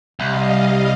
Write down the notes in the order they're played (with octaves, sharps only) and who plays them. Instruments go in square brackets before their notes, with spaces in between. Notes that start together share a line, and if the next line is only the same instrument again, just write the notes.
[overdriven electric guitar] C2 [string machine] G3 D#5 F5